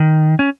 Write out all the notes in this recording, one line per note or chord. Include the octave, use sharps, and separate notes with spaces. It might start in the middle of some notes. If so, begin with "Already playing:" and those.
Already playing: D#3
C#4